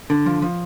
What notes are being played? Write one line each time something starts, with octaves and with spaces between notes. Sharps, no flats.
D3
F3
F3